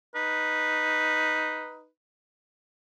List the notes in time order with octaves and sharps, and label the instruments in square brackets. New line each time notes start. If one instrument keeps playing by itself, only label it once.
[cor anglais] D#4 [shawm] B4